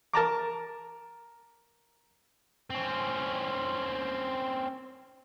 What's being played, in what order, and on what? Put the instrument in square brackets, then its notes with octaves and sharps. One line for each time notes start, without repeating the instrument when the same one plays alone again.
[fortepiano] A#4 A5 A#5 D6
[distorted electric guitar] C4 C#4